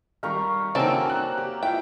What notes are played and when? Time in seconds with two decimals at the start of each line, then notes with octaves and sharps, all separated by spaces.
0.23 D#3 G3 F5 A#5 C#6
0.75 C#3 E3 F#3 A#3 C4 D#4 A4 D5
1.06 A5 A#5 F#6
1.38 G4
1.63 E4 F4 G5